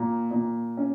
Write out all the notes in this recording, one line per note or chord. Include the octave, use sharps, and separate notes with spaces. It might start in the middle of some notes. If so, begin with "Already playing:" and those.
Already playing: A#2 A#3
A#2
C#4